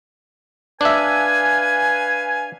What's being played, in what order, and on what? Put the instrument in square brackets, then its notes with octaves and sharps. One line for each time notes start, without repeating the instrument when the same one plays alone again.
[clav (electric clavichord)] D4 E5 [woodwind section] B4 F5 G#5